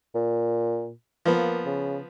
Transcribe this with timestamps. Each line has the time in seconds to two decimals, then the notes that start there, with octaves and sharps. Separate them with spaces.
0.15 A#2
1.25 F3 A#3 B3
1.66 C#3